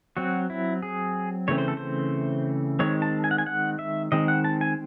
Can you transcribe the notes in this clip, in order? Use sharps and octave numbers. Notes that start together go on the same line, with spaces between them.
F#3 C4 F#4
E4
G#4
C#3 E3 A3 C4 C#5
C5
A4
C5
D#3 G#3 C4 C#5
A5
G#5
F#5
G#5
F#5
E5
D#3 G#3 C4 D#5
F#5
A5
G#5